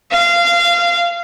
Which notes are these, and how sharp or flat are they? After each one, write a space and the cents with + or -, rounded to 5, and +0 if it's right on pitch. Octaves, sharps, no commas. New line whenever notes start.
F5 -20